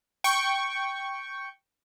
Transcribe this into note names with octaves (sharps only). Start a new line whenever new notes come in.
G5 C#6